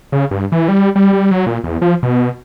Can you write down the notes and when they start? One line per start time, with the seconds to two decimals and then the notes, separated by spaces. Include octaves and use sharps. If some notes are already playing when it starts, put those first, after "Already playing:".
0.12 C#3
0.31 G2
0.52 E3
0.68 G3
0.95 G3
1.13 G3
1.31 F#3
1.46 A#2
1.64 E2
1.82 F3
2.03 B2